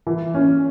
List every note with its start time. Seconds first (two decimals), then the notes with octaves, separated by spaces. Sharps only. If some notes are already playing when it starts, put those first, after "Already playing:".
0.07 E3
0.34 C#4